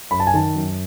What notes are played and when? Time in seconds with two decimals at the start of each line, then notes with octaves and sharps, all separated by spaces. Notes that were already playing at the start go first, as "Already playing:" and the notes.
0.11 F#2 B5
0.20 A5
0.27 G#5
0.34 D#3 A5
0.55 F#2